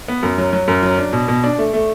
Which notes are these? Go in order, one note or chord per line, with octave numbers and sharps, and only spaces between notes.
B3
F#2
F#3
F#3
F#2
F#3
D4
B2
B2
D4
A3
A3